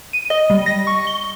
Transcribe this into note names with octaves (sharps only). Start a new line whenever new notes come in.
D#7
D#5
G3
A#6
C#6
G7